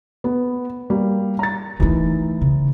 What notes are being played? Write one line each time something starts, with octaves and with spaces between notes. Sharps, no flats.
B3
G3 A#3
A#5 A6
D#3 E3 A3 D#4
C#3